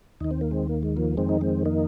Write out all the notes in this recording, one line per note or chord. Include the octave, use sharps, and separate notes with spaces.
D#2 D#3 D#4
C4
A#3
G#3 C4
A#3
G#3
F3 A#3
F2 D#3 G#3 C4
D#4
G#3 C4
A#3 D#4